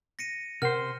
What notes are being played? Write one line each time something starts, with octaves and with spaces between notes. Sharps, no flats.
A#6 C#7 D#7
C3 A#4 C5 F#5 F6